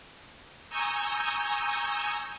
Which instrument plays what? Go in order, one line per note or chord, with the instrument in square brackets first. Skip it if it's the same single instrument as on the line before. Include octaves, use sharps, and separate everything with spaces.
[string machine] G#5 A#5 C#6 D#6 E6 G6